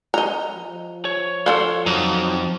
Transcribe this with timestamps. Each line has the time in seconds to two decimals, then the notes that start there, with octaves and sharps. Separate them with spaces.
0.14 D#5 A#5
0.55 F3
1.05 C#5
1.46 A4 C#5 D5 F5 C6
1.86 F2 F#3 D#4